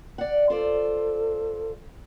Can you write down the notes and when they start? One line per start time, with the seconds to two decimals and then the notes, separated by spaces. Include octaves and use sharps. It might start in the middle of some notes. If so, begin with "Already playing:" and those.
0.18 D5 F#5
0.50 F4 A4 C5 D5